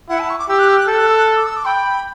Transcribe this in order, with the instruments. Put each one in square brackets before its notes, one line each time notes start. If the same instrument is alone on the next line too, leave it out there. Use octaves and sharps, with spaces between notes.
[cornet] E4 [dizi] F#5
[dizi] A5
C#6
D6
[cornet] G4 [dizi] E6
[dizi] F#6
E6
F#6
[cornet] A4 [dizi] E6
[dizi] F#6
E6
F#6
E6
D6
E6
D6
[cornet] G5 [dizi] B5